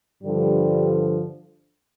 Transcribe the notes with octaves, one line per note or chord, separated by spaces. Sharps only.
G2 D3 F3 G3